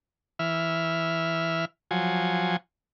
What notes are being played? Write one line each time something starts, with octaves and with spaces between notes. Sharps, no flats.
E3 E5 F6
F3 F#3 G#5